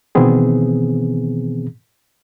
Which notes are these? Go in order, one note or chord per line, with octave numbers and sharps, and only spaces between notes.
B2 D#3 E3 B3 C4 G#4